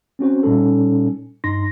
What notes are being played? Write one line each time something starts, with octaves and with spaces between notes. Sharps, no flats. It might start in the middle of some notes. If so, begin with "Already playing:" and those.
C4 C#4 F#4 C5
A#2 G3 C#4 D#4 A4
G2 D#4 C6 A#6